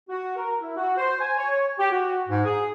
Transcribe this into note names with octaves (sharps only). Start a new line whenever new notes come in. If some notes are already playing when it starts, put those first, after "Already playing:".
F#4
A#4
E4
F#4
C5
G#5
C#5
G4
F#4
G#2
G#4